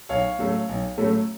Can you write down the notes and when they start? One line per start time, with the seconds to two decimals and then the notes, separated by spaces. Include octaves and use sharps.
0.09 B1 C#5 F5
0.39 A2 F#3 A3 C#4
0.69 B1
0.98 A2 F#3 A3 C#4